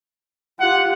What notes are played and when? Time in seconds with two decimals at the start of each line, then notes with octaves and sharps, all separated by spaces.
0.60 F4 G4 F#5